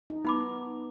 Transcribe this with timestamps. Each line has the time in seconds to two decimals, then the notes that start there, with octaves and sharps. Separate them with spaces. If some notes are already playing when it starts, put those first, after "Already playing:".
0.10 D#4
0.25 B3 D#4 B5 D6